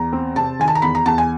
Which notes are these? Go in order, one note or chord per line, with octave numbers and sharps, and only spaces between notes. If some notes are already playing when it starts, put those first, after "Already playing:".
Already playing: E2 A#5
C4
C3 A5
D#3 G#5
A5
A#5
E2 B5
A#5
E2 A5
G#5